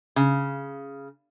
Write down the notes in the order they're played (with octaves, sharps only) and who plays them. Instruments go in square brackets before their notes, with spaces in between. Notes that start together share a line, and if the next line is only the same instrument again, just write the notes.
[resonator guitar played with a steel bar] C#3